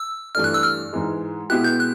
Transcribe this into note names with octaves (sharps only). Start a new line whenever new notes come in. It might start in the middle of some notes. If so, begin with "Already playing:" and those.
Already playing: E6
G2 E3 A3 D4 F6
F#6
E6
F6
G#2 E3 G#3
B2 G#3 B3 E4 G4 F#6
G6
F#6